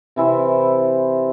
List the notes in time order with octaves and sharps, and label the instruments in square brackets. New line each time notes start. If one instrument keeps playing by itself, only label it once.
[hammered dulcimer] C3 E3 E4 C5